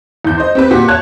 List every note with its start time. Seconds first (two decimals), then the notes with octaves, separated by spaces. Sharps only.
0.25 E2 G6
0.38 C5 D#5
0.55 C4 G4 B4
0.71 A#2 F#4 G4
0.88 C#5 A5 F#6 G#6